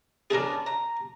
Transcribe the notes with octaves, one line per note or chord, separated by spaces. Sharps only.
B3 C#4 D4 G#4 A#4
A#5